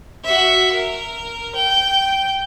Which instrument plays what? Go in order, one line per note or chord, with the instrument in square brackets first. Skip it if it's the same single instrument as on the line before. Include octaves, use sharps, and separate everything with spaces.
[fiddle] F#4 E5
A#4
G5